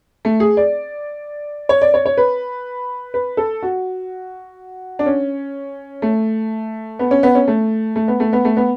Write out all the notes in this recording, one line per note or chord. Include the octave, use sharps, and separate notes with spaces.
A3
G#4
D5
C#5
D5
C#5
C#5
B4
B4
A4
F#4
D4
C#4
A3
B3
C#4
B3
C#4
A3
A3
B3
A3
B3
A3
B3